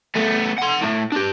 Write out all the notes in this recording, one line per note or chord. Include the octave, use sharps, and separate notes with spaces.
A3 B3
F#5 C6
A2 A3
D4 G4